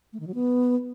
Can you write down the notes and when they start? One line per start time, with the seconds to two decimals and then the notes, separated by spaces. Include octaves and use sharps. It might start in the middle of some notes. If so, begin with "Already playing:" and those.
0.13 A3
0.20 D#3
0.27 F#3
0.34 B3